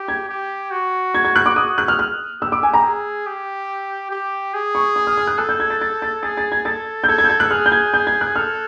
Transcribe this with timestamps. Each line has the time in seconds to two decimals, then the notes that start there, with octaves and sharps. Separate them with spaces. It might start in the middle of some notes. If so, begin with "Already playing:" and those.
Already playing: G4
0.08 G#6
0.29 G4
0.71 F#4
1.15 G#6
1.25 G#6
1.36 F#6
1.46 D6
1.56 F#4 D#6
1.78 F#6
1.88 F6
1.99 F6
2.41 G4 E6
2.52 D6
2.63 G#5
2.74 A#5
2.84 G#4
3.26 G4
4.11 G4
4.54 G#4
4.75 C#6
4.96 D#6
5.07 F6
5.17 F6
5.27 F#6
5.38 A4 F#6
5.49 G6
5.60 G#6
5.70 A6
5.81 A6
6.02 A6
6.23 G#4 A6
6.37 A6
6.52 G#6
6.65 A4 A6
7.04 G6
7.08 A4 G#6
7.18 G#6
7.24 G6
7.29 G#6
7.40 F#6
7.51 G#4 F6
7.66 G6
7.72 G#6
7.94 G6
8.07 G#6
8.21 F#6
8.36 A4 F6